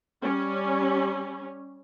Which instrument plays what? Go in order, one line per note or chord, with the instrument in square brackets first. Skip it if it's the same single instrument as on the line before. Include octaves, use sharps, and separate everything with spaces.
[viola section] G3 C#4